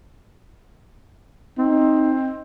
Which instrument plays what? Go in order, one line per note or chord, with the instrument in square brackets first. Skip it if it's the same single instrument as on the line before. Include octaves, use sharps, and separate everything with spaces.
[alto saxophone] C4 [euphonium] D#4